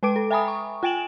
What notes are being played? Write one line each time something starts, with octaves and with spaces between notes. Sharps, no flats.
G#3 B4 G5 D6 D7
A4
E5 G5 G#5 A#5 B5 D#6
C#6
F4 G5 G#5 D7 E7 F#7